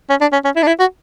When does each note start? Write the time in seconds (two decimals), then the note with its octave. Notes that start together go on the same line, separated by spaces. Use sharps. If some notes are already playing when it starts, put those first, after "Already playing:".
0.10 C#4
0.21 D4
0.33 C#4
0.45 C#4
0.56 E4
0.63 D4
0.67 E4
0.80 F#4